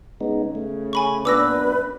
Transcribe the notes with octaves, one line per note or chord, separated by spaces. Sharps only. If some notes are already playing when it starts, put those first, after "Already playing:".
C#3 G#3 B3 D#4
A3
G#5 B5 C#6
A#2 B3 D4 B4 D6 E6 A#6
F#2